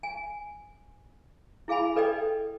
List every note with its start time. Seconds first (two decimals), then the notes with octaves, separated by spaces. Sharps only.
0.03 G#5
1.68 E4 G#4 F5 G#5 B5
1.96 A4 B4 D5 D#5 G5